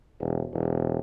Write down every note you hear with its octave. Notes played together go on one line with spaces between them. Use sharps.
E1
E1